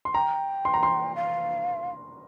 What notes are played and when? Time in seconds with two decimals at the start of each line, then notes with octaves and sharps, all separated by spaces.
0.05 C6
0.14 G5 A#5
0.65 C6
0.74 A#5
0.83 C6
1.15 F5